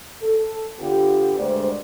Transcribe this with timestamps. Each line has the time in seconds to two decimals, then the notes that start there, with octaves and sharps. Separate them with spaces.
0.22 A4
0.80 D3 B3 F4 G4
1.38 D2 G2 G#3 C5 D5